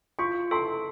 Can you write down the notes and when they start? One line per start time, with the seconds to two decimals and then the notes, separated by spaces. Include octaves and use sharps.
0.19 F4 C#6
0.51 A4 C6